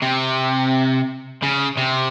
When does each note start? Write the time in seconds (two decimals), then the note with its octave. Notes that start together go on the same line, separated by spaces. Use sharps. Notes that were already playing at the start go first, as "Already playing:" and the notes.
0.02 C3
1.42 C#3
1.77 C3